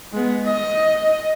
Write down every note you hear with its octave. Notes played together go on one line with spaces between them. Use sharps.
G#3 B3
D#5